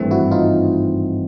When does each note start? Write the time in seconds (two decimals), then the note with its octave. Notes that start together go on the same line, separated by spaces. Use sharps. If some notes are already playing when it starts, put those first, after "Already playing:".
Already playing: G#1 G2 E3 A3 C4
0.11 E4 F#4
0.31 D#4 F4